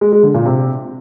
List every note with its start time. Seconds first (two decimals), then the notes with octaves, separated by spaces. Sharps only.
0.01 G#3
0.12 G#3
0.23 D3
0.34 A#2
0.45 C3